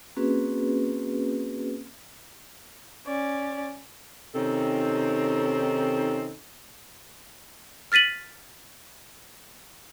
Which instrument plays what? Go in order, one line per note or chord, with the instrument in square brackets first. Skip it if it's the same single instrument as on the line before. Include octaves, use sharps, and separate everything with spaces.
[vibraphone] A#3 C4 C#4 F#4 G#4 B4
[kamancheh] C#4 D5
[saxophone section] C3 D#3 C4 C#4 D#4 A4
[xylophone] F6 A6 B6 D#7 F#7